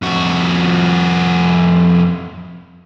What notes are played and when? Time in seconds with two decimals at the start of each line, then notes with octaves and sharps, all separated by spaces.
0.02 F2 F#4